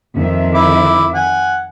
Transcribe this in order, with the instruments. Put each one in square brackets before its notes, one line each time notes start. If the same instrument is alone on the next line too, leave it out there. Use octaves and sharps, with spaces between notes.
[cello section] F2 D#3 E5
[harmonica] E4 D6
F#5 G#5